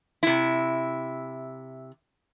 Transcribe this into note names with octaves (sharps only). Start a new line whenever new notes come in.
C3 E4